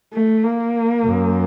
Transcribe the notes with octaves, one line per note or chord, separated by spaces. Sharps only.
A3
A#3
F#2